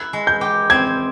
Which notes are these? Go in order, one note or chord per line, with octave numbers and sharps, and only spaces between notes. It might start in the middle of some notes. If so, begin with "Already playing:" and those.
Already playing: E4 F#6
G#3
G6
G4
C4 G#6